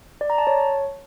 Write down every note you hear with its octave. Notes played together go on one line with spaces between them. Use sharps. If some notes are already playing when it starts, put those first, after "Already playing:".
D5
A#5
A5
C#5